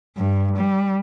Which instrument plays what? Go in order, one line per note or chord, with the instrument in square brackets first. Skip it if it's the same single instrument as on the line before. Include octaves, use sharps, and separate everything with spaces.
[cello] G2
G3